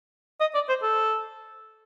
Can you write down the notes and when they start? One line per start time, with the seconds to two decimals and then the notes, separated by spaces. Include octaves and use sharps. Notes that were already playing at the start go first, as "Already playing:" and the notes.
0.40 D#5
0.55 D5
0.69 C5
0.83 A4